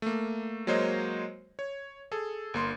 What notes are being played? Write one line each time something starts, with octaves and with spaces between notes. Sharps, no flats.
A3 A#3
F#3 G#3 A#3 C5 C#5 D#5
C#5
G#4 A4
G1 A#3 C6